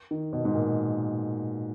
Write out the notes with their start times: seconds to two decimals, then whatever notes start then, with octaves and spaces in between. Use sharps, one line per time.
0.11 D#3
0.33 B2
0.45 G#2
0.55 A#2